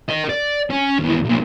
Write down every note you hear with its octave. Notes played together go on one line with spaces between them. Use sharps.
A#4 D#5
D5
C#4
D#2 E3
B1 A#2